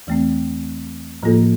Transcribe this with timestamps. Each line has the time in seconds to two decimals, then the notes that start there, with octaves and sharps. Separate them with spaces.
0.07 E2 E3 A3 C4
1.23 A2 F3 A#3 F4 A4